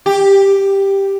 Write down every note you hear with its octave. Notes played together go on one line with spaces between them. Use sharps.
G4